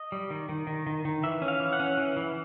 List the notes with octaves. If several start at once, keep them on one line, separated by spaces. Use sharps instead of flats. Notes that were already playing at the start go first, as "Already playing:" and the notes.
Already playing: D#5
G3
D#3
D#3
D#3
D#3
D#3
E3 E5
C#4
F5
E3
F#5
C#4
E3
E3